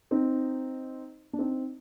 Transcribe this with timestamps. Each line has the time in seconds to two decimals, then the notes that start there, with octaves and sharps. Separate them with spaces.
0.11 C4 D#4
1.33 D4
1.39 C4 D#4